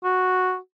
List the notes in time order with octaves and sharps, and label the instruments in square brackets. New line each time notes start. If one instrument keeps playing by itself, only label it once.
[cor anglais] F#4